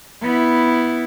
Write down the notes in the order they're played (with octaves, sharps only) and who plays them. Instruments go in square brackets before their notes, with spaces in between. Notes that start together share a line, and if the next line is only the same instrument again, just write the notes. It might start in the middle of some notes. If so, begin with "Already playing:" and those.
[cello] B3 E4